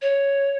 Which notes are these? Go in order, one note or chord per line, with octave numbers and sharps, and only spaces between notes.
C#5